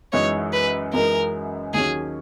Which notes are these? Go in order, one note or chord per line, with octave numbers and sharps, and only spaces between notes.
F#2 E3 G#3 D#4 C#5
B4
F#2 E3 G#3 D#4 A#4
D#2 D#3 F#3 C#4 G#4